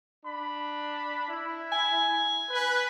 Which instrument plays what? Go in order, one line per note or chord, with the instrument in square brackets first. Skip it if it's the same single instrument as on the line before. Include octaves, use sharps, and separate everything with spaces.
[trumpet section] D4 B5
E4
[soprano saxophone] G#5
[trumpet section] B4